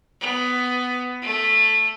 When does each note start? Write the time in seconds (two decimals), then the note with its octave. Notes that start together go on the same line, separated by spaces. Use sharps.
0.21 B3
1.22 A3